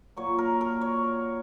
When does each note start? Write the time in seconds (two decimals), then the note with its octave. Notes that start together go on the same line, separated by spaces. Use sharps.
0.17 A#2 F#3 A#3 C#5
0.38 A#4
0.61 A#4
0.81 C#5